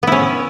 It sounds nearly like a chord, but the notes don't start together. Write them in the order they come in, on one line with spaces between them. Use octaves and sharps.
B3 E4 C#4